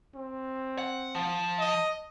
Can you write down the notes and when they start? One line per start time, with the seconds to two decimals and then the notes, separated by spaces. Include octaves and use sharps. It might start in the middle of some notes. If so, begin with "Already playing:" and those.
0.15 C4
0.78 F#5
1.15 F3
1.59 D#5